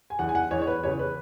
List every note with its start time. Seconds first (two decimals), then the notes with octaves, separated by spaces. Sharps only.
0.10 G#5
0.19 E2 E3 F#5
0.29 G#5
0.35 F#5
0.51 E2 E3 C#5
0.62 C#5
0.67 B4
0.83 E2 C#3 E3 C#5
0.99 B4